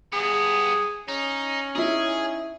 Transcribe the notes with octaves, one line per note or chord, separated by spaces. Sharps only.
G2 B3 G#4
C#4 D#4
D#4 E4 G#4